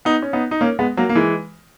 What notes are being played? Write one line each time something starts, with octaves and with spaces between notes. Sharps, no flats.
B3 D#4
C#4
B3 D#4
D#4
A#3 C#4
G#3 B3
F#3 A#3
A#3
E3 G#3